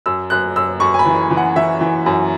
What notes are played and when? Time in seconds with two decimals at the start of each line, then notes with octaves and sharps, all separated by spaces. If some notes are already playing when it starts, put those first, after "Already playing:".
0.06 F#2 E6
0.30 F#2 F#6
0.56 F#2 E6
0.80 F#2 C#6
0.94 G#5
0.99 B5
1.06 E3
1.30 E3
1.37 F#5
1.56 E3 E5
1.80 E3
2.06 F#2